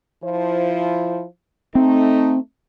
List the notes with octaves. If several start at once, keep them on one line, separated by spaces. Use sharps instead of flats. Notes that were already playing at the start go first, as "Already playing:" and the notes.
F3 E4 C5
A3 C4 D#4